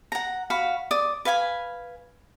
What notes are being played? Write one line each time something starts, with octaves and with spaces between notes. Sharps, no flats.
F#5 A#5
F#4 F5 B5
D5 D#6
B4 F5 G#5 B5